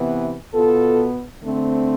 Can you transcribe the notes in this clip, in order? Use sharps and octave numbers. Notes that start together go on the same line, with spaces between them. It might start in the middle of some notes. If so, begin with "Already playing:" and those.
Already playing: C3 E3 B3
B2 B3 F4 A4
D3 A3 C4